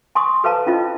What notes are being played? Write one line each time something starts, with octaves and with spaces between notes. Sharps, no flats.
G#5 C6 C#6 D#6
A4 B4 C5 F5 A5 A#5
C#4 E4 F4 C5 D#5